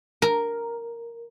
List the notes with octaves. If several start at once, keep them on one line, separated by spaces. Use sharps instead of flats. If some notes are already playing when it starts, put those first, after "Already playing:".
A#4